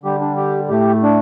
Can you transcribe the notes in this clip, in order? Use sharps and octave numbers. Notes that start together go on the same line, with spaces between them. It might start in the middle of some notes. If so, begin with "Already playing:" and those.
D3 G3 G4
D4
G4
A2 A3 G4
D4